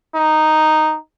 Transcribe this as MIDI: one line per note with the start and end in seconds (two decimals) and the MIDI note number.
0.16 0.97 63